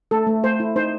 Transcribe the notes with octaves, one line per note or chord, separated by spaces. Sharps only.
A3 A4
A3
A3 C5
E4
D#4 C5